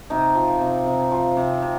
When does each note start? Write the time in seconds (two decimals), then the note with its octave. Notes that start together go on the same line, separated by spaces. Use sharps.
0.10 C3 D#4
0.35 F3
0.61 C3
0.86 C3
1.11 F3
1.37 C3
1.62 C3